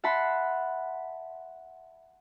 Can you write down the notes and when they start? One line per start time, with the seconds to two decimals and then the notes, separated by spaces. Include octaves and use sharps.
0.04 E5 F#5 A5 B5 C6